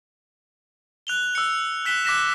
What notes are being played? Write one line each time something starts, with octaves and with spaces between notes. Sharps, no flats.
F#6 F7 G7
E6 C#7
F#6 B6 E7 G7
D6 F#6 A#6 B6 E7